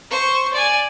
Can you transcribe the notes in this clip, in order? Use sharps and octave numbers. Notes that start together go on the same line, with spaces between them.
C5 C#6
D5 G#5